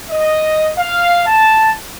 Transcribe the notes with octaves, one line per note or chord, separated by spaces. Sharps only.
D#5
F5
A5